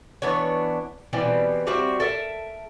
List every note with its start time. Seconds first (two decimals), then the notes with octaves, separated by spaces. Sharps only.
0.22 E3 B3 D4 C#5
1.13 B2 E3 G3 C4
1.67 G3 C4 F#4 E5
2.00 A4 A#4 E5